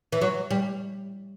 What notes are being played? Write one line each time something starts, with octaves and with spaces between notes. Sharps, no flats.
E3
F#3
G3